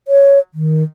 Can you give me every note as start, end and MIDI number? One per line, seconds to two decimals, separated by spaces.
0.08 0.39 73
0.54 0.83 51